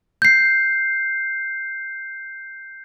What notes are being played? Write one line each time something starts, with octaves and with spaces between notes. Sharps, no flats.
G6 C7